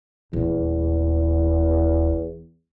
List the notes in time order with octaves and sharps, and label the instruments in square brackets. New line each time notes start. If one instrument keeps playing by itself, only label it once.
[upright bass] D#1 [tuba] E2